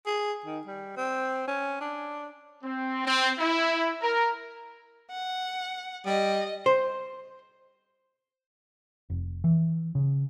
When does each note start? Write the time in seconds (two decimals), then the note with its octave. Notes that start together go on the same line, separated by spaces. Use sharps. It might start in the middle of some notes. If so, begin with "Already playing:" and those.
0.06 G#4
0.46 D#3
0.67 G3
0.97 C4
1.47 C#4
1.81 D4
2.63 C4
3.06 C4
3.39 E4
4.01 A#4
5.10 F#5
6.06 G3 D#5
6.66 C5
9.10 F1
9.44 E3
9.95 C#3